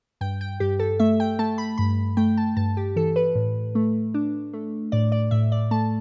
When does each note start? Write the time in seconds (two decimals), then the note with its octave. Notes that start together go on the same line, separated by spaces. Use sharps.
0.21 G2 G5
0.41 G5
0.60 G2 G4
0.79 A4
0.99 A3 E5
1.20 G5
1.39 A3 A5
1.58 B5
1.78 G2 B5
2.17 A3 G5
2.37 A5
2.57 G2 A5
2.77 G4
2.96 E3 A4
3.16 B4
3.35 A2
3.75 A3
4.14 D4
4.53 A3
4.92 A2 D5
5.12 D5
5.31 A2 E5
5.52 D5
5.71 A3 A5